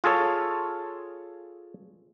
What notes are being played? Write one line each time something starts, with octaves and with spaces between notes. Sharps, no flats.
F4 G#4 A4 C#5